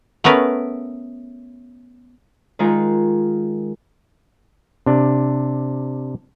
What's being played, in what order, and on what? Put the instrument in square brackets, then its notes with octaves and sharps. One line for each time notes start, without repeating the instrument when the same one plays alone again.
[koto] A3 B3 C#4 A#4 B4
[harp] D#3 G#3 D#4 F4 G#4 A#4
[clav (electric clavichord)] C3 D4